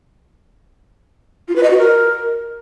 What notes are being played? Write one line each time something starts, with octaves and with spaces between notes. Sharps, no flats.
F4
B4
D#5
F#4
A#4